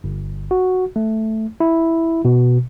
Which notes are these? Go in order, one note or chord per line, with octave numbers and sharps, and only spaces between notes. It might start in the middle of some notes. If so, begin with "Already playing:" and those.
G1
F#4
A3
E4
B2